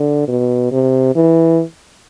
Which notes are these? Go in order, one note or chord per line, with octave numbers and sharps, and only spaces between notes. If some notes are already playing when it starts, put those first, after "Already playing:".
Already playing: D3
B2
C3
E3